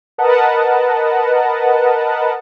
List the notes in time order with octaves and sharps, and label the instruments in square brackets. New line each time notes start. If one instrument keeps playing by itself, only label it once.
[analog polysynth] A#4 B4 D#5 F#5 A5